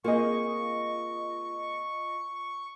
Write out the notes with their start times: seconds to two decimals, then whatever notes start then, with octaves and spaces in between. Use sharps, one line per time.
0.04 A#3 C4 F4 G#4 D#5 C#6